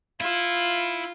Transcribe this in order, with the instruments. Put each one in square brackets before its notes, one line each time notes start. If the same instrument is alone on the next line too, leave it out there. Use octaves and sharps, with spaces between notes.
[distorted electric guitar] E4 [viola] F4